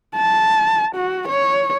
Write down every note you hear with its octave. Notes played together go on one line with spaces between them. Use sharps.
A5
F#4
C#5